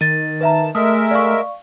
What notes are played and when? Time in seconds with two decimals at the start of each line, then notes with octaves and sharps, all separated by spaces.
0.01 D#3 A6 D#7
0.41 B4 E5 A5 A#5
0.75 G#3 A3 A#4 E5 D#6
1.11 D5 F5 C#6